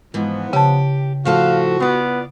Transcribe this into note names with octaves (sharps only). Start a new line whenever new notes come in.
G#2 E3 F3 B3
C#3 G4 A5
A2 F3 F#4 A4 F5
B3 F4 D5